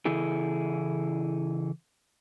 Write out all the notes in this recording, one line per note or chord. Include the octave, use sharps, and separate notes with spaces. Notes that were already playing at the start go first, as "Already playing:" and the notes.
C#3 E3 E4 G#4 A4